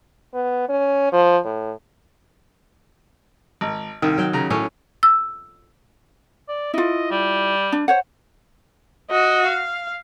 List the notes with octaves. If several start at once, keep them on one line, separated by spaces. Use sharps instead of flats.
B3
C#4
F3
A2
G#1
C2 D#3
F#3 G5
C#3 A#5
A2 C#4
E6
D5
E4 F4 D#5
G3
D4
C5 C#5 F#5
F#4 D#5
F5